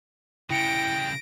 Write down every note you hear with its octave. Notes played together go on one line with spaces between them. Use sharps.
C#3 G3 E4 G5 A#6 C#7 D7